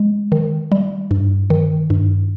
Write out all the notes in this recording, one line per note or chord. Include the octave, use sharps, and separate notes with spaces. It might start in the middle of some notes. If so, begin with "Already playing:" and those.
Already playing: G#3
D#3
G3
G2
D#3
G2